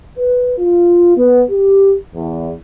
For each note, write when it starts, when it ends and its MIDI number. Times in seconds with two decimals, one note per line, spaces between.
0.17 0.53 71
0.58 1.15 65
1.18 1.43 59
1.50 1.94 67
2.15 2.53 40